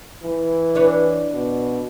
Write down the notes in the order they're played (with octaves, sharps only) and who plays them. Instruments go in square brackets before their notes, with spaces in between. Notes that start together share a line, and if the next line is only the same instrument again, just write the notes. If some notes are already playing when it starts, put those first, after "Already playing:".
[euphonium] E3
[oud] D4 B4 C#5
[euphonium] B2